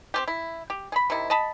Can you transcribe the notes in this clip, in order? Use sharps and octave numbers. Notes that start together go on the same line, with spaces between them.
C4 C#4 G4
E4
G4
G#4 B5
C3 D#3 E4
D#5 A5 B5